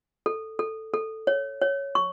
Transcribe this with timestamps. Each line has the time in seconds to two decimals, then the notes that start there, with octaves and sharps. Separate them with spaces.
0.26 A4
0.59 A4
0.94 A4
1.27 C#5
1.61 C#5
1.95 C#6